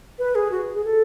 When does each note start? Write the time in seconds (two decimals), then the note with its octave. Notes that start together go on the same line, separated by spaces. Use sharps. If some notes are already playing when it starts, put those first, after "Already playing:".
0.19 B4
0.35 G#4
0.51 F#4
0.74 G#4
0.85 A4